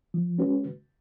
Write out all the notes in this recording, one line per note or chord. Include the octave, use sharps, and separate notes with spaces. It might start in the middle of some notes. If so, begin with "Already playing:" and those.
F3
G#3 C#4 F#4 B4